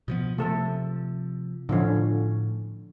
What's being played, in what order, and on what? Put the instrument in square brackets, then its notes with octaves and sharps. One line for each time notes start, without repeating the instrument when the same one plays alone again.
[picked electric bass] B2 F3 B3
[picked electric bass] C3 F3 [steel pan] A3 A4
[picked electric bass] A2 [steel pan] D3 F3 C#4